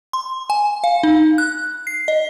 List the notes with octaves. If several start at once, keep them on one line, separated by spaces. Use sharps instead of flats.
C6
G#5
F5
D#4
F#6
C7
D#5